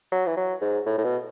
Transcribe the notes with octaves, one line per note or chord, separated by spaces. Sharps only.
F#3
E3
F#3
G#2
A2
A2
B2